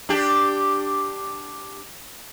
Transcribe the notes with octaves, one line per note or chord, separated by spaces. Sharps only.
D4 G4